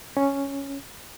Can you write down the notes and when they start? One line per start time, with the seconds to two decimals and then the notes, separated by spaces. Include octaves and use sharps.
0.17 C#4